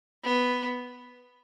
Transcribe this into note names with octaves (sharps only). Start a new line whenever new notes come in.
B3